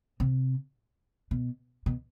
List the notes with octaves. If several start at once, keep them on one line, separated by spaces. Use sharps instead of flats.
C3
B2
B2